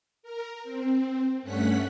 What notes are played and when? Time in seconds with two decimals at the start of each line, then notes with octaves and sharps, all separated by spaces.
0.23 A#4
0.64 C4
1.42 G2 A3 C#4 F#5 F#6 B6